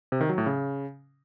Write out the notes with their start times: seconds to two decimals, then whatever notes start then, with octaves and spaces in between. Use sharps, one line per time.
0.12 C3
0.21 D#3
0.29 F#3
0.38 A2
0.46 C#3